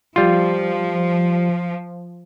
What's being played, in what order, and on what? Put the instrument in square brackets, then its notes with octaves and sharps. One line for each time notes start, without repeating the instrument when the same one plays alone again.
[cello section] F3 [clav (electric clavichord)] G3 F4